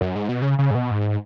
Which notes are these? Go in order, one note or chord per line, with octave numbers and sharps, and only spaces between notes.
F#2
G#2
B2
C#3
C#3
G#2
B2
G#2